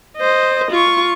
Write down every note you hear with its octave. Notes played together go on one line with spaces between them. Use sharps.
C5 D#5
F4 C#6